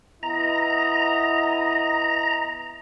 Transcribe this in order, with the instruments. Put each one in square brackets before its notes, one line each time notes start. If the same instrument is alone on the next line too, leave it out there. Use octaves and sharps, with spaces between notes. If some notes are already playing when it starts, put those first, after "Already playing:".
[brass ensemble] B3 E4 D#5 [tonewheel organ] A#5